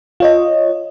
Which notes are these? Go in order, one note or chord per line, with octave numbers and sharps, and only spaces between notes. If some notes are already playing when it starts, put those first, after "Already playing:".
F4 C#5 D#5